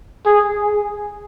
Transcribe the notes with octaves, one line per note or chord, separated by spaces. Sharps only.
G#4
G#4